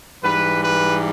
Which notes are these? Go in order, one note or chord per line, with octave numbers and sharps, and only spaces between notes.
G#2 E3 G3 B4
B4